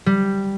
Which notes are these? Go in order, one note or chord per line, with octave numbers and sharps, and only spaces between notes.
G3